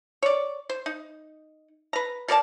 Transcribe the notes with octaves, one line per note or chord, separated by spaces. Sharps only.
C#5 D5
C5
D#4
B4 A#5
B2 A#4 D5 A5